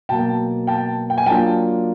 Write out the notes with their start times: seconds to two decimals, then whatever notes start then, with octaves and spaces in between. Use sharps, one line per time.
0.09 B2 F#3 A#3 G5 A5
0.67 G5 A5
1.10 G5
1.18 G#5
1.26 F#3 A#3 D4 F4 G5 A5